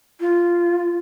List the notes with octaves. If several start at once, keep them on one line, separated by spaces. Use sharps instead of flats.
F4